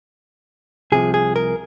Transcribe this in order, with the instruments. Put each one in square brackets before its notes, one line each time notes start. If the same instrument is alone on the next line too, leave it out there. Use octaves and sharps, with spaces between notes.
[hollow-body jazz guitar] C2 C3 F3 G#4
G#4
A#4